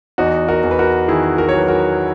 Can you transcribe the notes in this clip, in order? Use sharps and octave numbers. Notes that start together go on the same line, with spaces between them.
E2 D#4 F#4
F#4 A#4
E2
B4
F#4 A#4
D#3 E4 G#4
F#4 A#4
C#5
F#3 B4
F#4 A#4